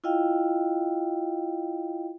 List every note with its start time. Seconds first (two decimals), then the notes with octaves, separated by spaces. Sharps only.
0.04 E4 F4 D#5 F5 G5